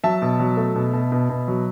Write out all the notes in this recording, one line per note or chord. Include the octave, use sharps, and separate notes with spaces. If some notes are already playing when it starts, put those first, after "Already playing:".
F#3 E5 A5
B2
F#3
A3
B2
B2
B2
B2
F#3